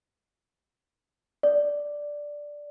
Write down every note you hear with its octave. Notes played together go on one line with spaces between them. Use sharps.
D5